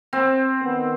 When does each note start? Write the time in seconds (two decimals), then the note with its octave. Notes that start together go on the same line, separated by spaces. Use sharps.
0.13 C4
0.61 D#3 B3